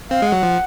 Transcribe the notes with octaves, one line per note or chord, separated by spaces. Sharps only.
C4 F5
G#3
F#3 F#5
F3